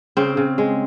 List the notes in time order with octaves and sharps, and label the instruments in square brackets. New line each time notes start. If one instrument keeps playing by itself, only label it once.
[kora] C#3 C4
C#3
G#3